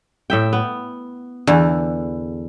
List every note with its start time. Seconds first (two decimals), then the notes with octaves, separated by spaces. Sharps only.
0.30 A2 E5 G5
0.53 B3
1.47 E2 D3